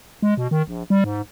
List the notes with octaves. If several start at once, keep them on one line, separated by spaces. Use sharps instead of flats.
G#3
B2
D#3
A#1
G3
G#2